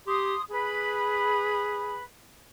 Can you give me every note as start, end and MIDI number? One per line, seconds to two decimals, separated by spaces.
0.07 0.35 67
0.07 0.40 84
0.07 0.40 87
0.50 2.00 68
0.50 2.02 71
0.50 2.02 83